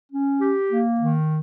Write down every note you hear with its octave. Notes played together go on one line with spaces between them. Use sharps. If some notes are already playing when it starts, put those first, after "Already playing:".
C#4
G4
A#3
D#3